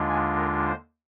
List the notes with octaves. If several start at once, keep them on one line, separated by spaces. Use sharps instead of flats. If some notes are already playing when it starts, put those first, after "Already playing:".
Already playing: D#2 D3 G#3 D4 F4
G#5
A#4
C5